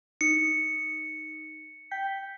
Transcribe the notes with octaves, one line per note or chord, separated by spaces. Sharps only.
D#4 C#7
G5 G6 B6